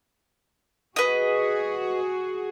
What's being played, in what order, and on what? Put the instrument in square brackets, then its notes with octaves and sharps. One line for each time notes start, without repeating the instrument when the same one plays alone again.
[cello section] F#4 G#4 [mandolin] B4 D#5